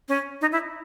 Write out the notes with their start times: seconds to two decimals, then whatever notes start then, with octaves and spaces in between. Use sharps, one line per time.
0.09 C#4
0.41 D#4
0.52 E4